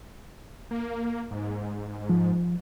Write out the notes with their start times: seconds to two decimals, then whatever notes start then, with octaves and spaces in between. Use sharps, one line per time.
0.71 A#3
1.31 G#2
2.09 F3